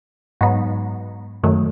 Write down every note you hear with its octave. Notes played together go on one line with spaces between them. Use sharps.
G#2 F#3 B3 D#4
F#2 D#3 F#3 A3